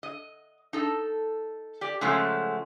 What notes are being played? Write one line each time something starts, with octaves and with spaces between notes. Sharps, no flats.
D#5
D#4 A4
G4 D5
C#3 F3 F#3 G#3 A3